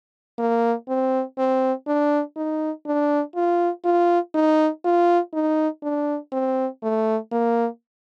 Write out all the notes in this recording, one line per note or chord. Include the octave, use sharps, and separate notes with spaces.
A#3
C4
C4
D4
D#4
D4
F4
F4
D#4
F4
D#4
D4
C4
A3
A#3